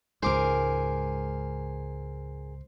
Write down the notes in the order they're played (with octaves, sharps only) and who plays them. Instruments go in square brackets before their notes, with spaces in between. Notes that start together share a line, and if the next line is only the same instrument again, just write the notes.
[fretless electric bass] C#2 G#2 [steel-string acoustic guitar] G#4 A#4 [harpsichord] C5 D6